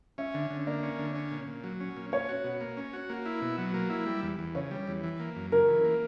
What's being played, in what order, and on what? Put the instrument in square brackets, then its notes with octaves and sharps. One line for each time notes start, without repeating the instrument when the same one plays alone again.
[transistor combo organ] C#4 [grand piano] E5
[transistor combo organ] D3
D3
[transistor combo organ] A#3 [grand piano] D5
[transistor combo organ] C#4
D3
C#4
A#2
A#2
F#3
C#4
A#2
[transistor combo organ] C#4 [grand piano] C#5
[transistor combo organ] F#4
B2
A#3
C#4
F#4
A#3
E4
B2
F#3
A#3
E4
G3
E2
E2
[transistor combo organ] C#3 [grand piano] C#5
[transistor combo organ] G3
E2
E3
A#3
F#2
[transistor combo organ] C#3 [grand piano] A#4
[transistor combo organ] E3
A#3